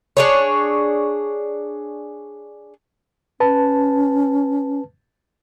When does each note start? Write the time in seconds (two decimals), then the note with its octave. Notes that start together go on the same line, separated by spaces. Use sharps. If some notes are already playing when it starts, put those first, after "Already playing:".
0.17 D4 G#4 C#5
3.40 C#4 B4 A5